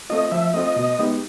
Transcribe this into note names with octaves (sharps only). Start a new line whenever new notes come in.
A3 C4 F4 D#5
F3 E5
A3 C4 F4 D#5
B2
G#3 B3 D#4 G4